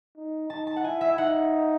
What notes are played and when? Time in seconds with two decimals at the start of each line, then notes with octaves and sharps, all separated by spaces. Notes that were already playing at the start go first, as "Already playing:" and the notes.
0.16 D#4
0.50 D#4 A5
0.67 A5
0.76 F#5
0.84 E4 G#5
1.01 E5
1.18 D#4 F#5